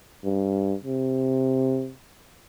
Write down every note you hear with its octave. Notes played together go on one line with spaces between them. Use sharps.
G2
C3